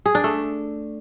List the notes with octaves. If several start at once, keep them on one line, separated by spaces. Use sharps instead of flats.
G#4
D4
A3